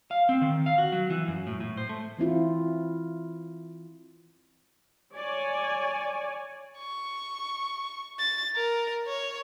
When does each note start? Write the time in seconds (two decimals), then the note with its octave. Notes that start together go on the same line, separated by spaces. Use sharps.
0.11 F5
0.29 C4
0.42 D#3
0.66 F5
0.78 F#4
0.92 F#3
1.10 E3
1.27 F#2
1.47 A2
1.60 A2
1.77 C5
1.89 A3
2.18 E3 C4 E4 F4
5.16 C#5 D5 G#5
6.79 C#6
8.19 A6
8.56 A#4
9.07 C#5